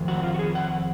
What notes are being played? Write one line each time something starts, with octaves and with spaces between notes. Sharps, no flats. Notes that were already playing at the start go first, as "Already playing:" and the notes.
Already playing: F2 D#3
F#4
F4
F#4
G#4
F#5